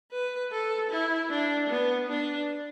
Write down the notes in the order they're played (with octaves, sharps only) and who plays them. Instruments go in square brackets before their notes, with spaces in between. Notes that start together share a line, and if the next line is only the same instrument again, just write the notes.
[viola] B4
A4
E4
D4
B3
D4